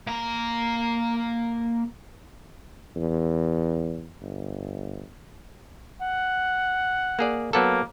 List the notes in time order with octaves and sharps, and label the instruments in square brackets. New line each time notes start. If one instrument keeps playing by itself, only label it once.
[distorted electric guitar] A#3 A#5
[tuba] E2
G1
[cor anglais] F#5
[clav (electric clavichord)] A#3 G#4 D5
[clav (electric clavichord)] F#3 B3 A4 [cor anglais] A#3